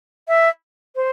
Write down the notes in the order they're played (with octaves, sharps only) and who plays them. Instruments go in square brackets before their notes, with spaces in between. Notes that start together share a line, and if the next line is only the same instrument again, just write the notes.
[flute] E5
C5